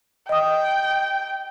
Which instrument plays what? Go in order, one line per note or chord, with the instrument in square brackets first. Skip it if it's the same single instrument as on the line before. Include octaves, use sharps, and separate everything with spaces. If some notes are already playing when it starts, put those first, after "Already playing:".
[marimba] D#5 D#6 [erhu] G5